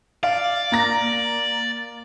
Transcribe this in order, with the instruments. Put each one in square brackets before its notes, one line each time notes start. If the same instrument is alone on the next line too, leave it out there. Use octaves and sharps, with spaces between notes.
[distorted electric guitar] D5 [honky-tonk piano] F5
[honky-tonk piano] A#3 A#5 A#6